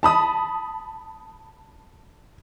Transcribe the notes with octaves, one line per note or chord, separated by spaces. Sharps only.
A5 B5 D#6